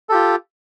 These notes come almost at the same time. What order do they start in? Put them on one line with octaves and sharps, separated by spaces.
A4 G4 F4